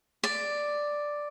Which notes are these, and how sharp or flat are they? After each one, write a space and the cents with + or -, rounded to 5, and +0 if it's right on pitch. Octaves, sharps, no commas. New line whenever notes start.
D5 +5